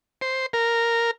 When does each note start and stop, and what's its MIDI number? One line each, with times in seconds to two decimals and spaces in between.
0.21 0.46 72
0.53 1.11 70